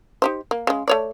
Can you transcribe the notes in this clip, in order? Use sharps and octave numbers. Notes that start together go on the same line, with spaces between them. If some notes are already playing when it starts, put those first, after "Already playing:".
D#4 G4 C5
A#3
C#3 G#3
A3 C#5 D5